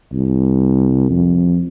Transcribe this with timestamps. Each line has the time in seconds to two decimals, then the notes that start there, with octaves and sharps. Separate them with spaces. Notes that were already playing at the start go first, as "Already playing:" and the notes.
0.13 C2
1.10 F2